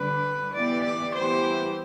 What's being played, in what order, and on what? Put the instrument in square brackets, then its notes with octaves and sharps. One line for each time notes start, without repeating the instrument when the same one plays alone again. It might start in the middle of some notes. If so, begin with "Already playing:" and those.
Already playing: [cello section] D3 G3 D4 [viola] B4
[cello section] E3 B3 E4 G4 [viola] D5
[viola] D5
[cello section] E3 G3 B3 E4 G4 [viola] C5